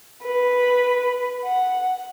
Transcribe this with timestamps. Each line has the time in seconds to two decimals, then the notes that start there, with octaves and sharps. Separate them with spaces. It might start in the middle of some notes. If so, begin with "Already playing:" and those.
0.23 B4
1.45 F#5